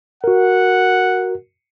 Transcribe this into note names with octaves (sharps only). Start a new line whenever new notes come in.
F#4 A#4 F#5